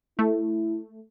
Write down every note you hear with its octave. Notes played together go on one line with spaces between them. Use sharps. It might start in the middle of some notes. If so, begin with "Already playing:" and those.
A3 E4